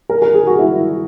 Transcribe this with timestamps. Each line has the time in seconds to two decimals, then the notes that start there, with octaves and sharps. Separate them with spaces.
0.09 A#4
0.22 A#4
0.34 G#4
0.47 F#4
0.59 E4